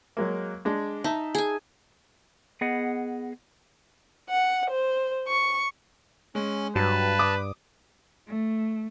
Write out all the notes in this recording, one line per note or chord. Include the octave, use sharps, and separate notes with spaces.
F#3 G#3 A#3
G#3 D4
D#4 E5 A5
G#4 G#5
B3 G#4 D#5 F#5
F#5
C5
C#6
G#3 C#4
G2 F#3 B4 A5
D6 D#6
A3